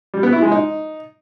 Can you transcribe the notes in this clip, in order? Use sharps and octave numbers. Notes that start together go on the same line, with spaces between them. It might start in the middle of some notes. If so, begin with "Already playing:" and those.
G3
B3
E4
G#3
D#4